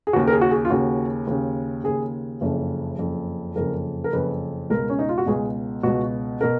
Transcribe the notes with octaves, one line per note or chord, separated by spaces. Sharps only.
G#4
D#2 C#3 F#4
A#4
G#4
F#4
G#4
F4
D#2 C#3 F#4
D#2 C#3
D#2 C#3 G#4
F#1 F2 C#3
F#1 F2 C#3
F#1 F2 C#3 A#4
A#4
F#1 F2 C#3 B4
C#2 B2 A#4
C#4
D#4
F4
F#4
C#2 B2 G#4
C#2 B2 F#4
B2 A#4